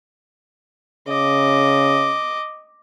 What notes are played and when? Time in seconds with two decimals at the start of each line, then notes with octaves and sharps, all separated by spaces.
1.08 C#3 D#5 D6